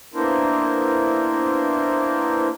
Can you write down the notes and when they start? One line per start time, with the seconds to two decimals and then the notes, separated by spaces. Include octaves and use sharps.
0.14 A#3 B3 D4 E4 A#4 C5